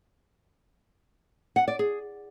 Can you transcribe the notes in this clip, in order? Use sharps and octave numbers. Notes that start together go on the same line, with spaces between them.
F#5
D5
G#4